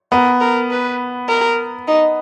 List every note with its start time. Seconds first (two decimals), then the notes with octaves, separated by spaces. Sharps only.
0.12 B3 A#4
0.41 A#4
0.70 B4
1.28 A#4
1.87 D#4